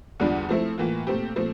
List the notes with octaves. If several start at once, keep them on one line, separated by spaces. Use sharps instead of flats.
E2 D3 G3 D4 F4
F3 A3 C4 E4
A2 E3 A#3 F4
A#2 A3 C4 G4
A#2 F3 A3 C4